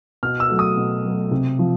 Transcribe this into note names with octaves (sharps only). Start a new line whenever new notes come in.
B2 F6
E6
F#3 A3
D#6
B2
F#3 A3
C3
F3